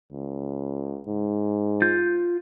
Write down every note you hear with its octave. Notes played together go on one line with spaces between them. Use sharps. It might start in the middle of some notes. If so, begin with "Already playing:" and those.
C#2
G#2
F4 G6